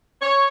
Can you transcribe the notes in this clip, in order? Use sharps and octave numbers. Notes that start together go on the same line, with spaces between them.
C#5